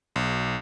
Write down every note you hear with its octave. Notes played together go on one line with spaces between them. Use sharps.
B1